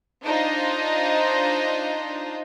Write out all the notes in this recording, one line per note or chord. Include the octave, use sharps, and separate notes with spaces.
D4 D#4 F4 C5 D#5